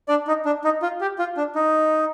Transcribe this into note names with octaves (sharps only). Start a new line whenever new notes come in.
D4 D5
D#4
D4
D#4
F4
G4
F4
D4
D#4